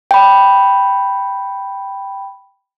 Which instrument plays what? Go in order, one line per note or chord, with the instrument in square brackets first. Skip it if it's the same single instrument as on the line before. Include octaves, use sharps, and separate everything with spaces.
[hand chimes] G5 B5